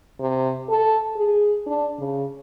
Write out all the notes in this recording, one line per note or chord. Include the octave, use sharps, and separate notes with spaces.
C3
A4
G#4
D4
C#3